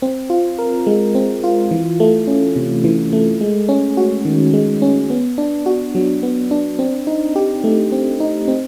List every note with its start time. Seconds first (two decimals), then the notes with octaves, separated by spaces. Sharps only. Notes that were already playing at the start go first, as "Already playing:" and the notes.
0.02 C4
0.30 F4
0.59 A#4
0.87 G#3
1.15 C4
1.44 F4
1.71 E3
2.00 A3
2.27 C#4
2.56 C3
2.84 E3
3.13 A3
3.41 G#3
3.69 C#4
3.97 F#4
4.25 D#3
4.53 G#3
4.82 C#4
5.10 B3
5.38 D4
5.66 F#4
5.95 F#3
6.23 B3
6.51 D4
6.79 C4
7.07 D#4
7.36 G4
7.64 A3
7.92 C4
8.20 D#4
8.48 C4